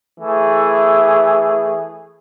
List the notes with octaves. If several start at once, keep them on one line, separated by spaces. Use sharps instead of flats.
E3 A3 G#4